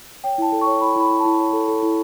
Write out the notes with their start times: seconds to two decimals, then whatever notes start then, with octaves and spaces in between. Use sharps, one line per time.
0.24 C#5 G5
0.38 E4 A5
0.52 A4
0.61 C#6
0.67 C#5
0.81 E4 B5
0.96 E4 B5
1.11 E4
1.20 A5
1.25 E4
1.39 C#5
1.53 A4
1.68 A4
1.83 E4